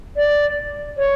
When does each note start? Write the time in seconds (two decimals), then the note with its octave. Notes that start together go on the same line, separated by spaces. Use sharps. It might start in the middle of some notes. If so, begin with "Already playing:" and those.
0.16 D5
0.97 C#5